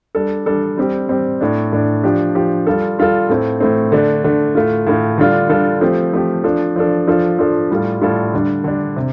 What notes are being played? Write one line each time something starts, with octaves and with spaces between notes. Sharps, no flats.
G3 D4 A4
G3 D4 A4
G3 C4 G4
G3 C4 G4
A2 A3 D4
A2 A3 D4
F3 D4 G4
F3 D4 G4
G3 F4 A4
G3 F4 A4
A2 A3 C4
A2 A3 C4
D3 A3 D4
D3 A3 D4
A2 A3 F4
A2 A3 F4
D3 G3 D4 F4 A4
D3 G3 D4 F4 A4
F3 A3 C4 G4
F3 A3 C4 G4
F3 D4 A4
F3 D4 A4
F3 D4 F4 A4
F3 D4 F4 A4
A2 G3 F4 A4
A2 G3 F4 A4
D3 G3 D4
D3 G3 D4
C3